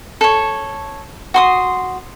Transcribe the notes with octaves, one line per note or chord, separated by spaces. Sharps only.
A4 C#5
F#4 C6 D#6